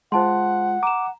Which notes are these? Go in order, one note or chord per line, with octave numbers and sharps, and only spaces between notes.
G#3 F4 C5 F#5 A5 C6
A#5 D6 E7